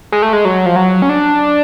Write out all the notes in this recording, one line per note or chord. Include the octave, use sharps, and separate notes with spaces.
G#3
A3
G#3
F#3
F3
F#3
C#4
D4